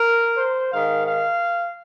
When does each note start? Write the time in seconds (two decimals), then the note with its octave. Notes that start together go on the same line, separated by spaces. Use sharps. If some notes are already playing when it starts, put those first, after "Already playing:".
Already playing: A#4
0.37 C5
0.72 G#2 D#3 F5
1.06 F5